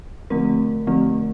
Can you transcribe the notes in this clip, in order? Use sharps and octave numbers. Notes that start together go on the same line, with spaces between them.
D3 F3 A3 C4 A#4
D3 F3 A3 C4